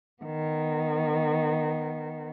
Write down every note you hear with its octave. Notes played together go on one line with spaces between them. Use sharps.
D#3 B3